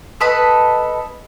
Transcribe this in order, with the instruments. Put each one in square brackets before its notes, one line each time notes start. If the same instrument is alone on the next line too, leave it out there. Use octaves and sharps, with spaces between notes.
[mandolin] A4 B4 D#5 B5